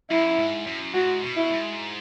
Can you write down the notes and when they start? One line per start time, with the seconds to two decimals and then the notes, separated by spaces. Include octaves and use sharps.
0.10 F#2 E4
0.39 G#2
0.67 F#2
0.94 G#2 F#4
1.22 B2
1.36 E4
1.50 G#2